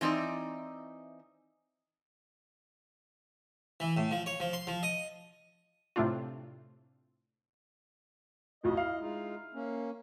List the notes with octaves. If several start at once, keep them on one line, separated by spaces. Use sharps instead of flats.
E3 C4 D#4 E4 D5
E3
A2
F3
C#5
F3
C6
F3
D#5
A2 C3 A3 C4 D4 F4
B1 F2 A2 D#5
E4 F5
G#3 D#4 F4
A#3 C#4